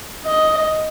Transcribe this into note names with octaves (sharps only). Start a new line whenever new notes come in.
D#5